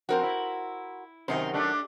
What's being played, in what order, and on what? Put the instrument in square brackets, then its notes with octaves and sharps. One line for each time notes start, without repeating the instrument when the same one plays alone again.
[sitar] F3 C4 [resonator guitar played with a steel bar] F#4 A#4 C5
[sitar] E4
[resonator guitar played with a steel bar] F#2 D#3 F#3 [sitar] C3 D#4 C5
[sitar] A3 D4 G4